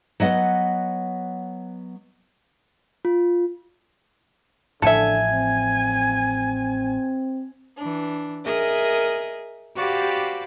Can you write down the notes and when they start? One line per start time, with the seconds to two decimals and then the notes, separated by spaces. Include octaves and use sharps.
0.20 F#3 B3 D#5 F#5
3.05 F4
4.82 A1 A2 D3 F3 A4 E5 G#5
5.31 C4
7.77 E3 D4
8.45 G#4 A#4 D#5 E5
9.75 F#4 G4 C5 D5 F5 B5